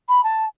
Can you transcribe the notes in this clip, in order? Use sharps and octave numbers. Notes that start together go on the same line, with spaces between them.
B5
A5